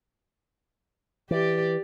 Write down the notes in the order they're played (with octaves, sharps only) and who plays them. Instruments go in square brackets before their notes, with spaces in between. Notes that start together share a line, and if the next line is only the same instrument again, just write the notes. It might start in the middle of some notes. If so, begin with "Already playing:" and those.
[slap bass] E3 [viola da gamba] G4 D5